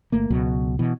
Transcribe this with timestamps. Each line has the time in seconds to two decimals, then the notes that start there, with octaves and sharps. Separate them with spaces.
0.12 G1 A3 A#3
0.30 C#2 B2 F#3
0.79 B2 E3